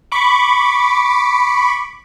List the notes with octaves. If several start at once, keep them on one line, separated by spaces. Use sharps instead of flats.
B5 C#6 D6